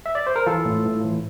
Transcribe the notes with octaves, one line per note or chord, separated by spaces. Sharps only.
E5
D5
C5
A#4
E3 F4 A4
A2
A2
E3